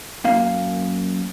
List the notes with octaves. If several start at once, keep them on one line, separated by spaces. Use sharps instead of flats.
F#2 A#3 F5